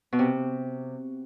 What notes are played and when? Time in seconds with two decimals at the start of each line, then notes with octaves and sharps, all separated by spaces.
0.13 B2
0.19 C3